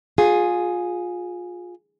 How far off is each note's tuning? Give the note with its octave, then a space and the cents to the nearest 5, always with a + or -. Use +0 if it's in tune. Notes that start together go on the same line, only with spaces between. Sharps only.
F4 +25 G#4 +0